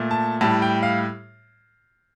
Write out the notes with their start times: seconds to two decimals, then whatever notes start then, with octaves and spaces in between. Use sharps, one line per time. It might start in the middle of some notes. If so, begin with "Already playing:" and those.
Already playing: A#2 A3
0.11 A5
0.41 A2 G3 A5
0.62 G5
0.83 F5